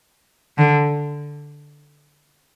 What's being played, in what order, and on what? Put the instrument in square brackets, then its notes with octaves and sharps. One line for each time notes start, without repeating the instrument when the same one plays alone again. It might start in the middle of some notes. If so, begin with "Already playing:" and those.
[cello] D3